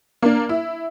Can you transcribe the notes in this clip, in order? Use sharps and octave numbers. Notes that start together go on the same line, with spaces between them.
A#3 D4
E4